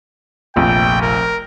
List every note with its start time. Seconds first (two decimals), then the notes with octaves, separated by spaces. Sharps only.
0.56 F1 A#1 F2 G5
1.02 A#4